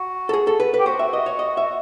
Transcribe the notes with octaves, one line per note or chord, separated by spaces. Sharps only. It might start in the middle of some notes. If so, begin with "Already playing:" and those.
Already playing: F#4
A4
G#4
A4
B4
B4
G4
F#4 C5
E5
D#5
C#5
D#5
E5